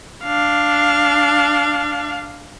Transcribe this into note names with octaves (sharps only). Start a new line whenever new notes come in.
D4 F5